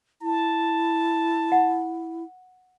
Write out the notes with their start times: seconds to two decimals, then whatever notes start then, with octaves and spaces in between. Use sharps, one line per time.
0.22 E4 A5
1.52 F#5